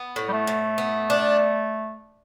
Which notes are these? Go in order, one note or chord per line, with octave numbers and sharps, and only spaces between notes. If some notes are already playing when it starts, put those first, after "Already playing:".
Already playing: B3
A2
G3
A3
A2
B3
D4